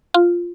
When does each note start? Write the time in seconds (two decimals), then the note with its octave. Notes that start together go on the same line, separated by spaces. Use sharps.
0.14 F4